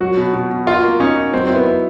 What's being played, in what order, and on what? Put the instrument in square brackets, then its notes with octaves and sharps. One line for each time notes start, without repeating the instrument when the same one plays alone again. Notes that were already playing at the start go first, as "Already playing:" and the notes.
[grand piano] F#3 [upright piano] F#4
[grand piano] B2
B2
B2
[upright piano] F4 [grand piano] F#4
[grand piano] A#3
[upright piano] C#4 [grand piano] D#4
[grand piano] D#4
[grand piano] F#3 [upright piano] C4
[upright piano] C4 [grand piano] E4
[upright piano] B3
[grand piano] E4